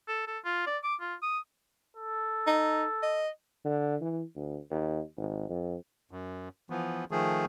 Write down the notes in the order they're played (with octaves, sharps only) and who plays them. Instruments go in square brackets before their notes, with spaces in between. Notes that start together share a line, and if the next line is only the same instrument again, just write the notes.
[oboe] A4
A4
F4
D5
D6
F4
D#6
[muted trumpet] A4
[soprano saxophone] D#4
D#5
[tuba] D3
E3
D2
D#2
G#1
F2
[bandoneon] F#2
E3 F3 B3
D#3 F3 A3 G#4